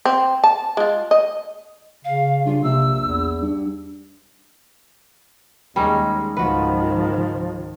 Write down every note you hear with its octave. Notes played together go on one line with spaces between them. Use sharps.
C4
A5
G#3 F4
D#5
C#3 F5
G2 F4
A#1 C3 E6
E2
G2
D#2 G3 G#3 C#4 D#4
C#2 G#2 D#3 F3 F#4 B4